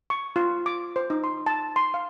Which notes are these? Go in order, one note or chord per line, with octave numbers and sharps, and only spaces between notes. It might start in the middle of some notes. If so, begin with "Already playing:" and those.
C#6
F4
D6
C5
D#4
C6
A5
C6
F5